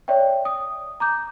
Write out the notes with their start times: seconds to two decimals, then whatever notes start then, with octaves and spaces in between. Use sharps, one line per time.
0.08 C#5 D5 E5 G5
0.45 D#6
1.00 A#5 D6 G6